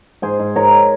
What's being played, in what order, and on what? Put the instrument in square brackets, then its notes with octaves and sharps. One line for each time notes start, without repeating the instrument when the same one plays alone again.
[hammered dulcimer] G#2 G#4 C5
G#2
G#2 A#4 C#5